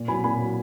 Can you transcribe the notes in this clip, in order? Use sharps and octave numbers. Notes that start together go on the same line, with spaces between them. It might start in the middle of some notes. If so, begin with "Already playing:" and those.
Already playing: A#2
F#3 G#5 B5
A#2 G#5 B5
F#3